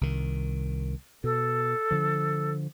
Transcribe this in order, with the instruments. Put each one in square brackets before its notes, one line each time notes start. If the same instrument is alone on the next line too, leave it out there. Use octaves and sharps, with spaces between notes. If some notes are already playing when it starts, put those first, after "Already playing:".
[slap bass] C2 D#3
[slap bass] B2 [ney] A4
[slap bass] D3 F3